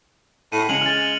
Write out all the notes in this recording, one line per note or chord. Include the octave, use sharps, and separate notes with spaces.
A2 D#7
C#3 G#3 C#7 F7 F#7
G#3 F6 A6